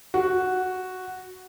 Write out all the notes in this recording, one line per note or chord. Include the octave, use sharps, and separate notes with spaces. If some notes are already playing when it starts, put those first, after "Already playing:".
F#4